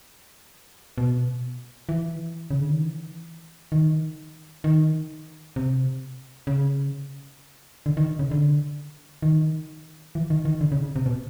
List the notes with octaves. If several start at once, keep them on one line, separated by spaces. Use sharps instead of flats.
B2
E3
C#3
D3
D#3
E3
D#3
D#3
C3
C#3
D3
D#3
C#3
D3
D#3
E3
D#3
D#3
D3
C#3
C3
B2